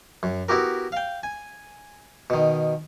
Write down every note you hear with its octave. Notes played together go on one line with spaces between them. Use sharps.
F#2
B3 E4 F#4 G4 A#4
F5 G5
G#5
B2 D#3